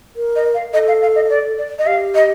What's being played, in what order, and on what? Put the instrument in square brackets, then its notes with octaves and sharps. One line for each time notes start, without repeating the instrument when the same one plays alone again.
[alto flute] A#4
[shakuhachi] D#5
F5
[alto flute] A4 [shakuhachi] D#5
[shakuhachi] F5
F5
D#5
D5
D5
D#5
[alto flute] G4 [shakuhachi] F5
[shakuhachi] D#5